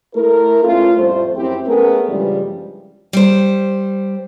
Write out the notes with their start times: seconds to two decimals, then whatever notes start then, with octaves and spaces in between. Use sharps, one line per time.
0.15 A3 E4 A#4
0.64 A3 B3 C#4 F4
0.97 F2 A2 G3 A3 C5
1.36 F#2 C4 E4 G4
1.67 A3 B3 C#4 G#4 A#4
2.08 G2 C#3 E3 F3 G3 G#3
3.13 G3 C5